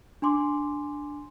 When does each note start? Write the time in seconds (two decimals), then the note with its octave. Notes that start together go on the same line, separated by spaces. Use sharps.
0.22 D4 G#5 C6 D6